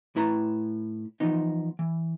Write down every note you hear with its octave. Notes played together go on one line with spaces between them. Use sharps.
A2 E4 B4 A#5
E3 F3 B3 D#4
E3